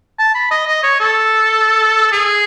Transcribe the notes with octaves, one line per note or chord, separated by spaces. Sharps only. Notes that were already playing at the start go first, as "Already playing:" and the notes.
A5
B5
D#5
D#5
C#5
A4
G#4